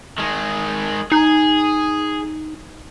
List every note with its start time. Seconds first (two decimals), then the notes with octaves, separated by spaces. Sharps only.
0.18 D#3 G#3
1.12 D#4 G#4